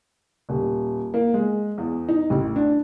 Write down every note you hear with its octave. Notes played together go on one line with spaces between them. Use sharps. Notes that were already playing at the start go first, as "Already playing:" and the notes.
D#1
A#3
G#3
E2
D#4
A1
D4